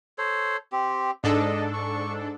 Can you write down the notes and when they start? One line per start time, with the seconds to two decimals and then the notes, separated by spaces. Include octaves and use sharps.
0.18 A4 C5 C#5
0.72 C4 G4
1.24 G#2 D4 A4 D#5
1.74 C#6